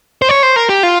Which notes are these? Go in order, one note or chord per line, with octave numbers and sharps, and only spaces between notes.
C5
C#5
C5
A#4
G4
F4